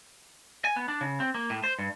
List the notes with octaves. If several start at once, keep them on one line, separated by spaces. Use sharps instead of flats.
G#5
B3
D4
C#3
C4
A#3
A2
C5
G2